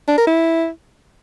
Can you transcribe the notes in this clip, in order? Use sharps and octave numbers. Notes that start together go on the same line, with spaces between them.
D4
A#4
E4